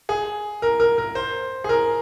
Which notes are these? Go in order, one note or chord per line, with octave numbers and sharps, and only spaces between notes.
G#4
A#4
A#4
A#4
C5
G#4
A#4